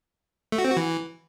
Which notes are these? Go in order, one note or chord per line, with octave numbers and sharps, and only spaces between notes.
A3
F#4
C4
F#4
E3